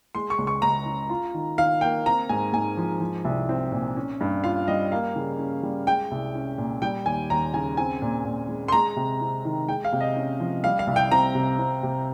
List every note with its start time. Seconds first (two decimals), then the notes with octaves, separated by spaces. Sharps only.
0.15 G#3 C6
0.30 C#6
0.38 C#2
0.47 C#6
0.62 C#2 A#5
0.86 C#3
1.10 F4
1.34 D#3
1.58 D#3 F5
1.81 A#3 G5
2.06 C4 A#5
2.29 G#2 G#5
2.53 G#2 G#5
2.77 F3
3.00 F3
3.25 C2
3.49 C4
3.72 A#2
3.96 C#4
4.21 G2
4.44 F4 F5
4.68 G3 D#5
4.92 A#3 F5
5.16 C#3
5.39 C#4
5.63 G3
5.87 G#3 G5
6.11 C2
6.35 C#4
6.58 A#2
6.82 G3 G5
7.05 D#2 G#5
7.30 D#2 A#5
7.54 C#3 G#5
7.77 C4 G#5
8.02 A#2
8.25 A#2
8.49 G#3
8.68 C6
8.72 G#3 A#5
8.96 C3
9.21 C4
9.45 D#3
9.68 G#3 G5
9.84 F5
9.93 C3
10.01 D#5
10.16 C#4
10.40 F3
10.63 G3 F5
10.79 F5
10.87 C2
10.96 G5
11.11 C4 A#5
11.35 C3
11.59 C4
11.83 C3